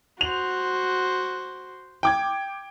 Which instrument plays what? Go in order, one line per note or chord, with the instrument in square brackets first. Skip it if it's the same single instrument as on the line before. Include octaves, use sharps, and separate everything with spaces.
[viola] F#4 C5 [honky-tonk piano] F7
[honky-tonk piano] G5 D6 G#6